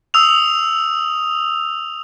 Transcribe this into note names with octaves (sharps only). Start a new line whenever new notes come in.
D#6 E6 F7